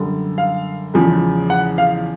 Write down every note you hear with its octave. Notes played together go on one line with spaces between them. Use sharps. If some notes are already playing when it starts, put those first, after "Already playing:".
Already playing: F#2 D3 G3
F5
E2 C#3 F3 G#3
F#5
F5